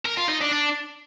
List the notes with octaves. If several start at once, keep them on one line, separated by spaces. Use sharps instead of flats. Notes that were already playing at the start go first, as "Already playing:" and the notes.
A#4
F4
D#4
D4
D4